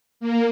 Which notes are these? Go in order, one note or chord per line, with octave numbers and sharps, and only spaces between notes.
A#3